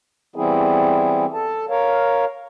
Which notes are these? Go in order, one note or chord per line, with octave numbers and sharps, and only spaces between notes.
E3 G3 B3 C4 E4 G#4
A4 A5
A#4 C#5 F5